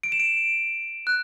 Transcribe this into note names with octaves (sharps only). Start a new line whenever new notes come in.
D7
E7
D7
F#6